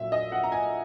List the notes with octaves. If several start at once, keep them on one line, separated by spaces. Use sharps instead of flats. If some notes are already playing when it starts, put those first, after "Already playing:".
Already playing: A#1 A#2 F#3 E5
D#5
F#5
A#5
G#5